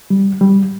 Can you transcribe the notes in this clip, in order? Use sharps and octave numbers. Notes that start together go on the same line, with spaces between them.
G3
G3